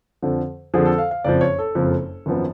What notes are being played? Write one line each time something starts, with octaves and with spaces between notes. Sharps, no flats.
F2 D3 F3
F2 D3 F3 G#4
A4
F5
F5
F#1 F2 F3 D5
C#5
A4
F#1 F2 F3
G#1 F#2 F3 B3